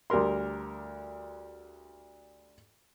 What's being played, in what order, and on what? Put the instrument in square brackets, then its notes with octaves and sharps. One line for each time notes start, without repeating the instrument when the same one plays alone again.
[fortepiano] D2 G3 A#4 C6